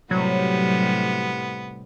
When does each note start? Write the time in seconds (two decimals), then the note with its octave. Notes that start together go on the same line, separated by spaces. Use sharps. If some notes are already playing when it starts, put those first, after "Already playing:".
0.11 A2 C3 F#3 G3 B3